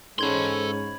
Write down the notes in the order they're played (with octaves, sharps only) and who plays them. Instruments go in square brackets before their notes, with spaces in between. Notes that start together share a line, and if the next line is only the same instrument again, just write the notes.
[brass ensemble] G#2 [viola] C#4 [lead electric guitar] A4 C6 [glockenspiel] B5 G#6 F#7